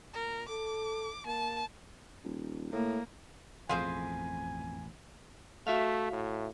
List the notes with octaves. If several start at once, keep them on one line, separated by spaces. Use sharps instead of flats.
A#2 A#4
A4 D6
A#3 A5
D#1
A2 A#3
A1 F2 B2 F4 G#4 C5 G#5
A3 F#4 E5 F5
A2